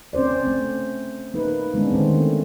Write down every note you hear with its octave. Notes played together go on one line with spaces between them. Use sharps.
C4 C#4 C5 D5
A3 C4
A#3 D#4 B4
D3 G#3 B3 C#4 D4
D3 D#3 A3 C4